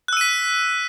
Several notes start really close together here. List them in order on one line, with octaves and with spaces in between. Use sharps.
F#6 E6 D#7 B6